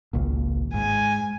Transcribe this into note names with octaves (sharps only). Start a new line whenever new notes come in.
G#1 C#2 A#2
G#2 G#5